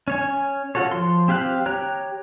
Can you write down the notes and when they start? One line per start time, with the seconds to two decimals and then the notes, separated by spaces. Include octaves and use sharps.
0.08 C#4 C#5 G#5
0.75 F4 F#4 A4 C#5
0.91 F3 C6
1.28 C4 G4 F5 G5 F#6
1.66 G4 C#5 G5 A#5 F#6